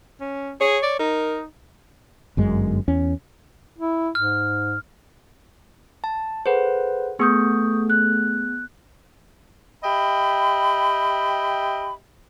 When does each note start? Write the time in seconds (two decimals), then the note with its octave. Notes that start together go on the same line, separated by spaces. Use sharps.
0.20 C#4
0.61 G#4 C#5
0.83 D5
0.99 D#4 A#4
2.37 G1 F#2 G#3
2.88 E2 C#4
3.78 E4
4.15 G#2 F6
6.04 A5
6.46 G#4 A4 B4 C5 F#5
7.20 A3 B3 G#4 C#6 D#6 G6
7.90 F#6
9.83 G4 D#5 E5 G5 B5